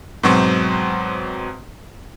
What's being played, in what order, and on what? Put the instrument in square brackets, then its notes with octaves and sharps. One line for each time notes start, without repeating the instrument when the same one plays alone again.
[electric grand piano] G#2 B2 F#3 C4 C#6